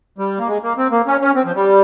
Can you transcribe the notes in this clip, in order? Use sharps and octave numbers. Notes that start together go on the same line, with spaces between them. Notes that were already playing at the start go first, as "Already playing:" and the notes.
G3
A#3
G#3
A#3
C4
A#3
C#4
C#4
C4
F3
G3